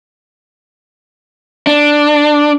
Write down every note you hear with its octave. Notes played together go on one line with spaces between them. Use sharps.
D4